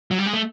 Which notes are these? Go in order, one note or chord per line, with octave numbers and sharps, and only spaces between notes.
F#3
G3
G#3
A3